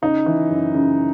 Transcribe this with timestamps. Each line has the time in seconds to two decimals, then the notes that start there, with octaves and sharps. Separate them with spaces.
0.02 C#3 D#4
0.26 E3
0.50 F#2
0.74 C#3